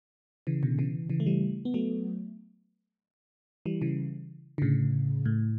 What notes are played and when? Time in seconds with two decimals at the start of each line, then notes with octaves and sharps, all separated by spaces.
0.47 C#3 E3
0.63 B2 D3
0.78 C#3 E3
1.10 C#3 E3
1.20 A3
1.26 E3 G3
1.65 B3
1.74 F#3 A3
3.66 E3 G3
3.82 C#3 E3
4.58 D3
4.62 A2 C#3
5.26 A2